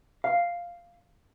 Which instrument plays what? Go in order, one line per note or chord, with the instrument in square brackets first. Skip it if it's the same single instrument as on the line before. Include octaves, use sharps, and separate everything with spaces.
[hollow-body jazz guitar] F5